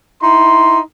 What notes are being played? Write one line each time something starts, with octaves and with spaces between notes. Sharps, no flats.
D#4 E4 C6